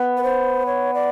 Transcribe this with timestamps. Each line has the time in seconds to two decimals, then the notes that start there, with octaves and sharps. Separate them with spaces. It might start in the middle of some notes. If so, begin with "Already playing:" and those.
Already playing: B3
0.17 B4
0.23 C5
0.66 C#5
0.94 D5